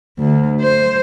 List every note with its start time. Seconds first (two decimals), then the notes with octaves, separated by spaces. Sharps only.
0.19 D2
0.62 C5